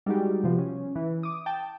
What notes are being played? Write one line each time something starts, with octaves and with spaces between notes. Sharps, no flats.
G3 G#3 D#4 F#4 G4
C3 F3 B3
C#4
E3
D6 D#6
G5 A5